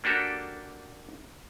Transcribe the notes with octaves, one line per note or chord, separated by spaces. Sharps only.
A#3 D4 F#4 G4 A4